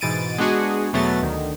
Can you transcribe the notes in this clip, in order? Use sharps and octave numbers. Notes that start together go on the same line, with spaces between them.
G#2 B2 E3 A6 D7 D#7
G#3 B3 D4 F#4 G#4
E2 B2 F#3 A3 B3 A6
D2 D#3